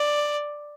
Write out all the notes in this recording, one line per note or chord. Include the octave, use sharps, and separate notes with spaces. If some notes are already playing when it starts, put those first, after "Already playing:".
Already playing: D5